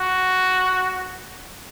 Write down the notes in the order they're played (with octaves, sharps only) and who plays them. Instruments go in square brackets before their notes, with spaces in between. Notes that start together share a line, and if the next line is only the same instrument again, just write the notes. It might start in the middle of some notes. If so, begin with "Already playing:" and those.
Already playing: [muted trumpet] F#4